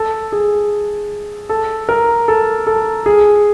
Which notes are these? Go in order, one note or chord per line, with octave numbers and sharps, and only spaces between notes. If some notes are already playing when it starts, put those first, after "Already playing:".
Already playing: A4
G#4
A4
A#4
A4
A4
G#4